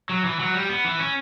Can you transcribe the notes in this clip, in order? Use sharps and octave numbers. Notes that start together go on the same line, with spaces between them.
F#3
E3
F#3
G3
B3
E3
C#4